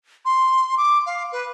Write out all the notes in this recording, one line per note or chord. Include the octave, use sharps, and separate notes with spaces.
C6
D6
F5
B4